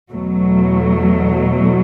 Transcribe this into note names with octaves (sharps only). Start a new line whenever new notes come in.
E2 B2 F#3 A3